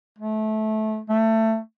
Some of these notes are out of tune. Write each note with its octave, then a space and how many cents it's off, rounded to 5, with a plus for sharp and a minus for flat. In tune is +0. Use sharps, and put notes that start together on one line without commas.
A3 -20
A3 +20